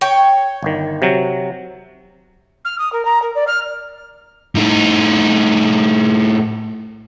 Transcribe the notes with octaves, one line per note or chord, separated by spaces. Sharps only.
C#5 G5
G1 D#3
C3 F#3
F6
D#6
A#4
A#5
A#4
D5
F6
A2 D#4